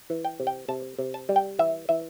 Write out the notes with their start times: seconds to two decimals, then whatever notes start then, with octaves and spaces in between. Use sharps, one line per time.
0.10 E3
0.25 G5
0.40 C3
0.47 G5
0.68 C3 A5
0.99 C3
1.14 A5
1.29 G3
1.36 G5
1.59 E3 E5
1.89 E3 E5